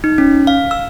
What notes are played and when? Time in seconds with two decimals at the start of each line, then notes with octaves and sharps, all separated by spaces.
0.04 D#4
0.18 C#4
0.47 F5
0.71 E6